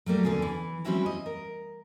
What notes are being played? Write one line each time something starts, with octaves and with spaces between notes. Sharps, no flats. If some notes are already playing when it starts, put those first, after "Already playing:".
F#3 G3 A3 A#3 G4
E2 D3 C#4 G#4
E3
G3 C4 C#4 E4 F#4 G4
D#5
A#4